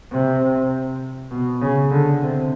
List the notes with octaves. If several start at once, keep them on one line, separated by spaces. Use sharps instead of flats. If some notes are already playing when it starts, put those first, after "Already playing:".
C3
B2
C#3
D3
C3